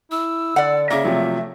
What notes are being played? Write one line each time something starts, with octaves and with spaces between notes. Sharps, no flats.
E4 E6
D3 D5 F#5
C#3 A#3 E5 D6 A#6
C3 F3 F#3 A3